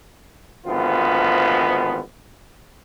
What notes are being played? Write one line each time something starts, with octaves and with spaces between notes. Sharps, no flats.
G#1 D2 D#3 F3 B3 F4